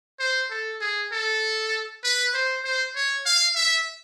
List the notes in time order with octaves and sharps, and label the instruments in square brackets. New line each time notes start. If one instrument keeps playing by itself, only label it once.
[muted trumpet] C5
A4
G#4
A4
B4
C5
C5
C#5
F5
E5